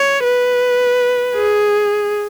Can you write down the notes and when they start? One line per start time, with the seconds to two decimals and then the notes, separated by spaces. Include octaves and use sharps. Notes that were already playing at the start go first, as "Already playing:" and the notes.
Already playing: C#5
0.24 B4
1.36 G#4